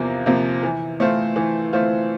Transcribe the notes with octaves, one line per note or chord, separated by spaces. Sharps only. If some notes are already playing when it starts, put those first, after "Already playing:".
Already playing: E2 C3 F3 A#3
C3 F3 A#3
E3
A3 C4 F4 C5
E3
A3 C4 F4 C5